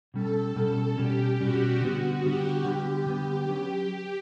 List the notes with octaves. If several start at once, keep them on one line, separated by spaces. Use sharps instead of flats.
B2 G3 C#4 A4
B2 G3 C#4
B2 G3 C#4 G4
B2 G3 C#4 F#4
D3 G3 B3 F#4
D3 G3 B3 G4
D3 G3 B3 G4
D3 G3 B3
F#3 C#4 G4 B4